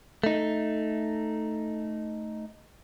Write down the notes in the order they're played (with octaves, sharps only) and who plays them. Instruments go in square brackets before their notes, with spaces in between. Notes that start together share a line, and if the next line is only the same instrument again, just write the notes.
[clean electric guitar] A3 D#4